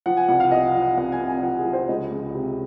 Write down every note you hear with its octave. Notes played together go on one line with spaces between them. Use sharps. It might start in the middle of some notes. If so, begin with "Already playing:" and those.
F3 F#5
G#5
C2 F#5
F5
C2 D#5
F#5
F3
F#5
C2 F#5
G#5
C3
G#5
F3 F#5
G#4
F3
C5
C#2 D#5
C#2
C3